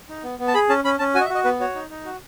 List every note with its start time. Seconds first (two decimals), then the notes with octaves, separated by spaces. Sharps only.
0.09 D#4
0.23 B3
0.39 B3
0.48 A5
0.54 G#4 B5
0.69 C#4 A5
0.84 C#4 B5
0.99 C#4 A5
1.15 F#4 G#5
1.21 D#5
1.25 E5
1.30 F#4
1.35 D#5
1.45 B3 B4
1.60 F#4 C#5
1.75 D#4
1.90 D#4
2.05 F#4